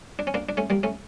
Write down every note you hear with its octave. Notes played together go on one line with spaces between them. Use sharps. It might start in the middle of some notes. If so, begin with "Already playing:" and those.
D4
C#4
A#3 D4
D4
A3 C#4
G3 A#3
A3 C#4